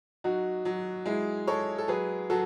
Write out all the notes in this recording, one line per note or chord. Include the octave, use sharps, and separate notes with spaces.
F#3 D#4 F#4
F#3
G#3 E4 G#4
G#3 A4 C#5
A4
F#3 G#4 B4
F#3 F#4 A4